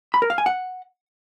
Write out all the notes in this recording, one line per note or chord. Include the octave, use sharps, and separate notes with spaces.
B5
A#4
F5
G#5
F#5